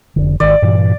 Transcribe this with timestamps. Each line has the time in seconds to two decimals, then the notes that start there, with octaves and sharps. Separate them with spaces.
0.16 F1 A#1 D3
0.40 G#1 D#3 D5
0.62 G2 A#2 E3